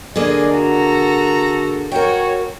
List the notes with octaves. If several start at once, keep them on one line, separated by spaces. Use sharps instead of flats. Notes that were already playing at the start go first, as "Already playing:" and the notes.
D3 A#3 G#4 D5 D#5 G#5
F#4 A4 A#5
F#4 A#4 C#5 G5